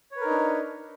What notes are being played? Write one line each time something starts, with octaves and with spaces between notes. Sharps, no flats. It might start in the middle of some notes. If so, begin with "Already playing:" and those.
D4 D#4 A#4 B4 C#5